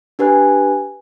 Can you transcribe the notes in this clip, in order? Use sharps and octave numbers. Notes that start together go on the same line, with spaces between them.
D4 G4 B4 G#5 F#6